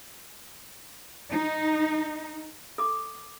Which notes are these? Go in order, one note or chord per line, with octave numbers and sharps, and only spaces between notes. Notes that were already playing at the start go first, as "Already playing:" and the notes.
D#4
A4 D6